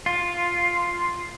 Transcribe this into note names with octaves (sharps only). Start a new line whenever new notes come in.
F4